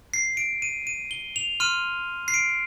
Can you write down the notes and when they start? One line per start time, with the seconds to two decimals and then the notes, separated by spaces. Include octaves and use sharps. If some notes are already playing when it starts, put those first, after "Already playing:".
0.14 C7
0.37 D7
0.62 D#7
0.87 D#7
1.11 G7
1.36 F7
1.60 C6 F6 D#7
2.28 C7
2.34 D7